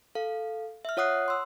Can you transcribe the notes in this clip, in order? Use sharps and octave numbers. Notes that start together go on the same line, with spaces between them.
A4 F5
E5 F6
F4 C#5 F#5 D#6 F#6 C7
C6 E6